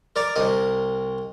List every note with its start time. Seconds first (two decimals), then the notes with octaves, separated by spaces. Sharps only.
0.16 A#4 D5 A#5 D6
0.36 C2 A#4 D#5